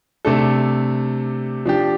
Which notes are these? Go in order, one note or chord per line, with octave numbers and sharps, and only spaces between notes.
C3 A3 D4 A4
F3 D4 G4